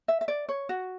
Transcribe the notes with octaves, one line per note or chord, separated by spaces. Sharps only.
E5
E5
D5
C#5
F#4